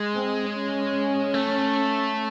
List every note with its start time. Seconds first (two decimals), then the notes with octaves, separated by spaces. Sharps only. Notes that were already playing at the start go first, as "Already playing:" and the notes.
Already playing: G#3
0.13 C4
0.53 C#4
1.34 A3